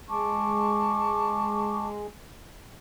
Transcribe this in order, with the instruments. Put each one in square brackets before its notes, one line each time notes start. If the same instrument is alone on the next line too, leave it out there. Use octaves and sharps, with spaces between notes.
[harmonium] G#3 [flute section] A5 C#6 D6